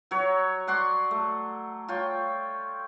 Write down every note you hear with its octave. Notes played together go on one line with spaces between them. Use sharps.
F#3 C#5
D5 F#5 C6 C#6
A3
F4 C#5 G5